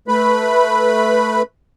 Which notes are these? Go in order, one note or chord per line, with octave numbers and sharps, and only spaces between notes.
A3 B4 B5